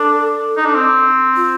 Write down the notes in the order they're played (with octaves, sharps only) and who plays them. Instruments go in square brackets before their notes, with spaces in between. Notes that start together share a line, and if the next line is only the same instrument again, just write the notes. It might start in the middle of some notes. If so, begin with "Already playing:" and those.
Already playing: [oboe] D4 [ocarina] A4
[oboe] D#4
D4
C4
[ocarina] F4